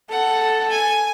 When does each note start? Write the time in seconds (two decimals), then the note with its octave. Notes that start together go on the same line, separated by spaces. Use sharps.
0.11 A4 F#5
0.70 G#5